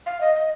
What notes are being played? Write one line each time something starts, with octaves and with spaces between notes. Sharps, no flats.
F5
D#5
D#5